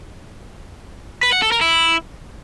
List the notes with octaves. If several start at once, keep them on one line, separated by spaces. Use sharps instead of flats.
B4
F#5
A4
A#4
E4